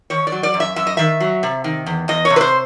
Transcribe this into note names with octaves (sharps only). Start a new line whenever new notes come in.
D#3 C#5
D5
F#3
D5
F#2
E5
F#2 E5
D#5
D#3 E5
F#3
C3
D#3
E2
E2 D#5
C#5
C3
B4
C5